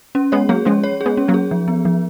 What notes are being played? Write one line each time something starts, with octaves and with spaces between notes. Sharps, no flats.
C#4
G#3 B3 C#5
F#3 A#3 G#4
F3 G#3 C#4
C#5
G#4
G#3 B3
C#4
F#3 A#3
G#4
F3
B3
F3